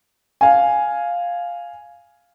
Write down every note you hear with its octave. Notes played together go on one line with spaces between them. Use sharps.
F5 G#5